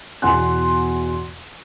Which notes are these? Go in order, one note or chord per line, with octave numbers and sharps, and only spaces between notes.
E2 B2 F#5 G#5 C6 F#6